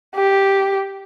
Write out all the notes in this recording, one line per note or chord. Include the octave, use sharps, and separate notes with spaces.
G4